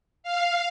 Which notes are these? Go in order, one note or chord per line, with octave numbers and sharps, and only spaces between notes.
F5